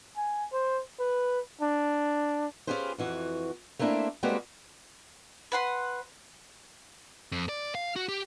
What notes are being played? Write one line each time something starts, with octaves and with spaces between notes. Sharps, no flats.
G#5
C5
B4
D4
C#4 F4 G4 G#4 B4 C5
F2 E3 F#4
A3 A#3 C4 D4 E4
G3 G#3 A#3 C4 F#4 B4
B4 F#5 C6
F2
D5
F5
F#4
G4